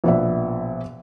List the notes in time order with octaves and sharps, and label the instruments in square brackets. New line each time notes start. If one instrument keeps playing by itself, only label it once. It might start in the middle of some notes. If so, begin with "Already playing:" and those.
[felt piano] A#1 B2 B3 F#4 D5 E5